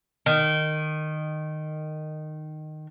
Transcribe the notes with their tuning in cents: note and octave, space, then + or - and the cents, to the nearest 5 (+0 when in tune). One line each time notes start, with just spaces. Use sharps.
D#3 -15